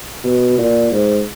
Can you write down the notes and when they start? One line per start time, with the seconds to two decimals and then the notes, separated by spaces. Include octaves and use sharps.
0.24 B2
0.58 A#2
0.92 G#2